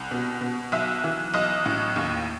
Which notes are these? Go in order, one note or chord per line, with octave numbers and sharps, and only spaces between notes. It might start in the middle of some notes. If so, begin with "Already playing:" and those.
Already playing: C2
B2
B2
B1 E5
E3
B1 D#5
A2
D#2